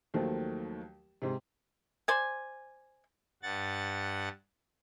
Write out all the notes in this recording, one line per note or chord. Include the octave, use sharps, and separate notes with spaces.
D#2 D#3 F3 F#3 A3
G#2 C3
C5 D5 G#5
G2 F#5 A6